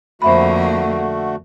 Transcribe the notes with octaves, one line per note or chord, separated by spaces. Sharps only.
F2 D3 A3 A#3 F#4 C5 E5 B5